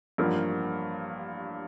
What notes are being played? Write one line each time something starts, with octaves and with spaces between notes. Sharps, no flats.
A1 G2 F3 A#3